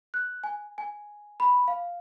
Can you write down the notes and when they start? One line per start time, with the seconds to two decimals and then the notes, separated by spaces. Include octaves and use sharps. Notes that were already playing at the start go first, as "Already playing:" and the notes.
0.14 F#6
0.44 G#5
0.78 G#5
1.40 B5
1.68 F5